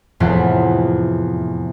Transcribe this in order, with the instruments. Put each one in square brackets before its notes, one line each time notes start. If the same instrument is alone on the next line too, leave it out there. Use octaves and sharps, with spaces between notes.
[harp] F1 E2 A2 E3 F3 F#5